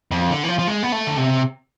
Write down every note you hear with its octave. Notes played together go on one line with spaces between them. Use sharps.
F2
D3
E3
F3
F3
G#3
B3
A3
D3
C3